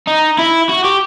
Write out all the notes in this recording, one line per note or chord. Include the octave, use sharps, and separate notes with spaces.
D#4
E4
F#4
G4